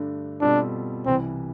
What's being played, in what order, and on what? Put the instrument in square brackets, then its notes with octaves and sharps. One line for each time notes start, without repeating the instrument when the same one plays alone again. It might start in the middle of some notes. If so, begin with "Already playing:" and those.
Already playing: [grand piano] G2 D3 A3 D4
[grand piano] B2 G3 C4 F4 A4 [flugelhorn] D4
[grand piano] C2 C3 E3 G3 [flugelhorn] C4